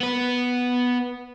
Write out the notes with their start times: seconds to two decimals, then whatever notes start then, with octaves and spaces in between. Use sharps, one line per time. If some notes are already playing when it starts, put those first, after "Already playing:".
0.01 B3 B4